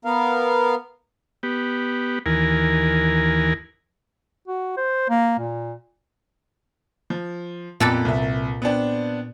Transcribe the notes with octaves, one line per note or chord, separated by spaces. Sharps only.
B3 A#4 F5
B3 G4
D#2 E3 A#4 G#5
F#4
C5
A#3
A#2
F3
F2 A#2 B3 A4 B4 A6
C2 E5
B3 C4 D4